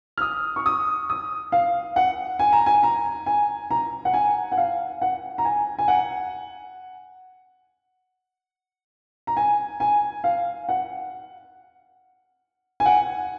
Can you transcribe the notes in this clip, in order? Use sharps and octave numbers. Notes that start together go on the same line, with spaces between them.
F6
D#6
C#6
D#6
D#6
F5
F#5
G#5
A#5
G#5
A#5
G#5
A#5
F#5
G#5
F#5
F5
F#5
A#5
G#5
G#5
F#5
A#5
G#5
G#5
F5
F#5
G#5
F#5